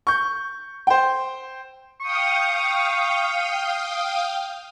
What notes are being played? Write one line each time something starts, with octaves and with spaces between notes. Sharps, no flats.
C#6 G6
C5 G5
F5 G5 C#6 D#6